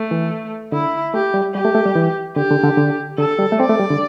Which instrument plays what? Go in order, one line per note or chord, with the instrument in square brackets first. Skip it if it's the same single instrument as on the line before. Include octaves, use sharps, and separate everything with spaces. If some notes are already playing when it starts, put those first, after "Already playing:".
Already playing: [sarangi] A3
[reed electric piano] E3
[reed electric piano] D3 [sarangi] E4
[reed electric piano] A3 [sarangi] G4
[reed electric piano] G3
[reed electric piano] G3 [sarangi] G4
[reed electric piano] A3
A3
G3
E3
[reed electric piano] D3 [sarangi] G4
[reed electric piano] D3
D3
D3
[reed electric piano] D3 [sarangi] A4
[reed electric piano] G3
A3
[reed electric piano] C4 [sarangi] D5
[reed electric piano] A3
G3
D3